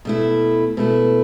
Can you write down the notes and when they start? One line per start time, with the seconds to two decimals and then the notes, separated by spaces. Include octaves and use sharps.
0.05 B2 A3 E4
0.77 B2 A3 E4